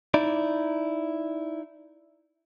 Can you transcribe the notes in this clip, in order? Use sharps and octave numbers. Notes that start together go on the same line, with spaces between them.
D#4 E4 D5